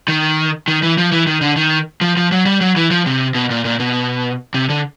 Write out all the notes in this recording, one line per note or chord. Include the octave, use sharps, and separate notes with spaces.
D#3
D#3
E3
F3
E3
D#3
D3
D#3
F3
F3
F#3
G3
F#3
E3
F3
C3
B2
A#2
A#2
B2
C3
D3